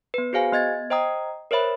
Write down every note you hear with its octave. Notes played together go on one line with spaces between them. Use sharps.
B3 B4
F#4 G#4 C5 F5 G#5
B3 D#5 G#6 A6
C5 D#5 G5 A#5 D#6
A#4 C5 C#5 E5 B5